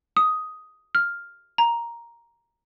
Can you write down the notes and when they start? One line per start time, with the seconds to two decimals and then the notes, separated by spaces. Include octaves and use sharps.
0.17 D#6
0.95 F6
1.58 A#5